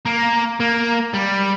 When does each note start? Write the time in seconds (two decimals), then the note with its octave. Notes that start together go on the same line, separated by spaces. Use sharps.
0.05 A#3
0.60 A#3
1.13 G3